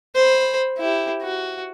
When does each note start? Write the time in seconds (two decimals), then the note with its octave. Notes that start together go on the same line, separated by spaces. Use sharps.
0.15 C5 B5
0.78 E4 G4
1.22 F#4